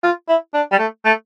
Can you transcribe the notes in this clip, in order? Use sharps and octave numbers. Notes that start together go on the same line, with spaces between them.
F4
E4
D4
G3
A3
A3